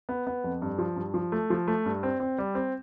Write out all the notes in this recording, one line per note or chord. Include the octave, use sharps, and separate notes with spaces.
B3
B3
F2
G2
F3
G2
F3
A3
F3
A3
G2
C4
C4
G3
C4